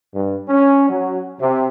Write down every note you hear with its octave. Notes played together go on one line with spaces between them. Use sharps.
G2
C#4
F#3
C3